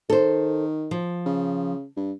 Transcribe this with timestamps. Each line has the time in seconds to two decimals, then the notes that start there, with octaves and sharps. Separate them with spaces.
0.10 D#3 A4 C5
0.91 F3
1.26 C#3
1.97 G2